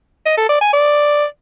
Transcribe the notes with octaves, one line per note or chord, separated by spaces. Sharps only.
D#5
A4
D5
G#5
D5